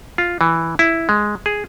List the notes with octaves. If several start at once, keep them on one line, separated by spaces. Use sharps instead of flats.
F4
E3
E4
G#3
G#4